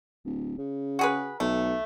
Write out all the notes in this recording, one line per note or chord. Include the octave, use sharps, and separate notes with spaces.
D1
C#3
F#4 G#4 B4
B1 A3